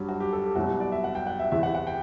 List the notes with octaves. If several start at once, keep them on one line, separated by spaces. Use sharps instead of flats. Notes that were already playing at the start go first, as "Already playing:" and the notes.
Already playing: G2 F#3 G4
F#4
G4
A4
G4
C2 B2 F#3 F#4
G4
D5
E5
F#5
G5
F#5
E5
E2 C3 E3 E5
F#5
F#5
G5